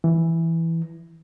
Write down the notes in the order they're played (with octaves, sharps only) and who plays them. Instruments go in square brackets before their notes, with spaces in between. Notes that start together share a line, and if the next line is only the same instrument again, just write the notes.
[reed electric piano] E3